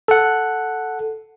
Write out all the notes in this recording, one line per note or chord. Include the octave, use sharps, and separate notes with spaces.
A4 F#5